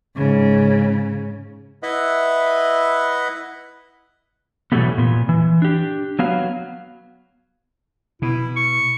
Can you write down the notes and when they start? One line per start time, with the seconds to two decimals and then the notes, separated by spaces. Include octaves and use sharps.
0.15 G#2 C#3
1.83 E4 B4 D#5 E5 F#5 B5
4.72 B2 E3 F#3 G3 A3 B3
4.98 A#2 B3
5.29 E3
5.62 D4 G4
6.19 F#3 B3 F5
8.22 B2 E4
8.56 C#6